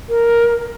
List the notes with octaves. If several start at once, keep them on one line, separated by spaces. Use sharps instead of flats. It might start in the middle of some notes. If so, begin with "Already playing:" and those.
A#4